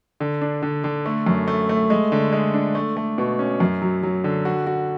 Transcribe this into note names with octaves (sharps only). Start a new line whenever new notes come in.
D3
D4
D3
D3
A3
F#2
A3
A3
G#3
D3
G#3
D4
A3
A3
B2
C#4
F#2
F#3
F#3
D3
F#4
F#4